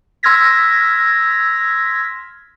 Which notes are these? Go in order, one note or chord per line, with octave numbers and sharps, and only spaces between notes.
C6 E6 F6 G#6 A#6 B6